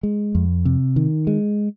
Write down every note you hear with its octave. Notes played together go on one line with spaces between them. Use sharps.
G#3
F2
C3
D#3
G#3